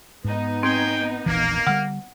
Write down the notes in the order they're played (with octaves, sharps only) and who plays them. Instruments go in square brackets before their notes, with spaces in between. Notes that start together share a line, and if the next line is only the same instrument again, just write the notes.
[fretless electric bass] G#2 [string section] B3 D#4
[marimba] C4 [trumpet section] G#4 C#5 G5
[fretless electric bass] E1 A#1 E3 [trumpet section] A#3
[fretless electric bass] D3 G3 [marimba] F#5 F6